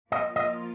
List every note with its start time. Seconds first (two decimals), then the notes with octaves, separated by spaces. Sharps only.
0.12 F3 A#3 F4 D#5
0.36 D#5